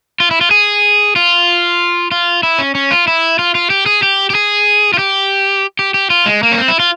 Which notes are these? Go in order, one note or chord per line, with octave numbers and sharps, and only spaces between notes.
F4
E4
F4
G#4
F4
F4
E4
C#4
C#4
F4
E4
F4
F4
G4
G#4
G4
G4
G#4
F4
G4
G4
G4
F4
G#3
A#3
C#4
C4
E4
F4